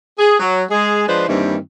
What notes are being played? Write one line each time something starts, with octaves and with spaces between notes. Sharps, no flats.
G#4
F#3
G#3 G#4
F3 G#3 D4 B4 C5
G2 D#3 E3 G3 A#3 C4